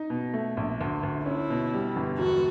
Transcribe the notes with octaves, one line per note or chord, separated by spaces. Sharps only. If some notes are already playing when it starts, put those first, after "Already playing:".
Already playing: D#4
B2
A3
A#1
D2
D2
C#4 E4
B2
G3
G1
E1 F#4